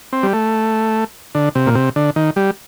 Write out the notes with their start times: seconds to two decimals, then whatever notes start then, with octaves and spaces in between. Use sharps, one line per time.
0.13 C4
0.23 G3
0.33 A3
1.35 D3
1.55 C3
1.67 A#2
1.75 C3
1.96 D3
2.16 D#3
2.36 G3